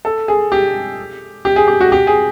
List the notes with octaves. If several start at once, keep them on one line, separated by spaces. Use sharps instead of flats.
A4
G#4
G4
G4
G#4
G4
F#4
G4
G#4